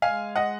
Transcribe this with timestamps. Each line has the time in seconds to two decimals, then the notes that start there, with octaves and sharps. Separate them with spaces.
0.02 G#3 F5 G#5
0.36 D#5 F#5